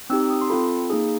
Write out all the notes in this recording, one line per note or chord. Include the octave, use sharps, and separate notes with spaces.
C4 D#4 G4 E6
D#6
C6
C4 F4 A4 B5
A#3 D#4 G#4